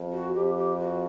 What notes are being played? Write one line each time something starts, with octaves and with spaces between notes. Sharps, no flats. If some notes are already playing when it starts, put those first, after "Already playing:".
Already playing: F2
F#4
F2 G4
G4
F#4